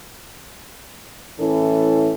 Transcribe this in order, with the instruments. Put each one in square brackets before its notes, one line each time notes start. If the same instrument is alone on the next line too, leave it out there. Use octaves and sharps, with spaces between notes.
[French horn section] A2 E3 C#4 E4 A4